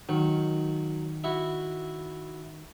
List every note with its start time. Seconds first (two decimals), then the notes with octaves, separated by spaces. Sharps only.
0.09 D#3 F#3
1.24 E4 F#4